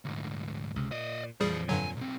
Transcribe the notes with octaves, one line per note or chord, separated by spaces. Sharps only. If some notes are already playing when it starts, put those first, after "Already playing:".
D2 G#2
C#2 C3
A#2 D5 D#5
F2 A#2 E3 G3 G#4 C5
G2 D3 F#3 G#5
B1 C4